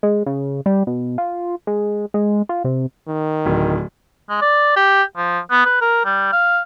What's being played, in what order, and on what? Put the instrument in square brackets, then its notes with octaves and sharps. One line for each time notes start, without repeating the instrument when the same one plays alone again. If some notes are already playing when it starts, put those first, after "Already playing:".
[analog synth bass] G#3
C#3
G3
B2
F4
G#3
G#3
F4
C3
[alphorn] D#3
[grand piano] D1
[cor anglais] G#3
D5
G4
F3
B3
B4
A#4
G3
F5